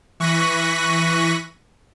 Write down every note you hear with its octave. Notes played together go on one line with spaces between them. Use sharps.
E3 C#6 F#6 A#6 B6 D#7